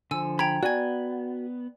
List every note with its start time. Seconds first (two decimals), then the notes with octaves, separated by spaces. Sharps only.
0.11 D3 F3 G#5 E6
0.39 G5 A#5 B5 G#6
0.63 B3 F#4 D5 G#5 G#6